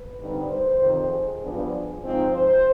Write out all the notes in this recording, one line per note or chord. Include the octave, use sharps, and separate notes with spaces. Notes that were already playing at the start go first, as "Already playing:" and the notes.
Already playing: B4
G2 D3 G3 C4 D#4
C5
F2 C3 D#3 C5
G#4
G2 F3 B3 D4
G#2 F3 C4 D#4
C5